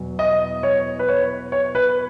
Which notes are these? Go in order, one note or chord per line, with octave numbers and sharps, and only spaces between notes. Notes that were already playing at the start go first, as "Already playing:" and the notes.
Already playing: E2 B2 F#3
D#5
C#5
B4
C#5
C#5
B4